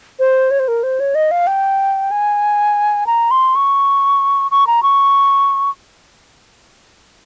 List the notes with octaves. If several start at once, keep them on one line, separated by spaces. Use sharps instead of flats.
C5
C#5
C5
A#4
C5
C#5
D#5
F5
G5
G#5
A#5
C6
C#6
C#6
A#5
C#6